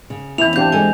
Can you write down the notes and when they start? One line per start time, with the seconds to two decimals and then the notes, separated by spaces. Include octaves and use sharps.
0.10 C#3
0.38 F2 E3 B3 C#4 E4 F7
0.56 C4 D4 G4 C5 F5 A5 G6
0.72 G#3 G#4 A4 C5 D#5 G#5